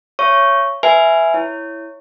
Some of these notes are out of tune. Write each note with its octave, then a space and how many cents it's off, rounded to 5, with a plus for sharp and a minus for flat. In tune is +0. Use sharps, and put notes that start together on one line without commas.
C#5 +0 E5 +40 C#6 +0
B4 +0 E5 +0 G#5 +0
E4 +0 C#5 +0